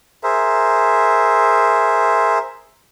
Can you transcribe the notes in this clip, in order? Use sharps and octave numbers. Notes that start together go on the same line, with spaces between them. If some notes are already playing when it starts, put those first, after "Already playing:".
G#4 A#4 C5 E5